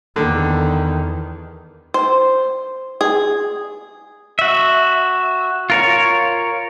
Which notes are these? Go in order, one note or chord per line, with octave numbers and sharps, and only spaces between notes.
E2 D3 D#3
C5
G#4
F#4 E5
F4 A#4 C#5